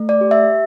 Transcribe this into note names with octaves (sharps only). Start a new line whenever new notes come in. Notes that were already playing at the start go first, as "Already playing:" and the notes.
Already playing: A3
D5
G4
E5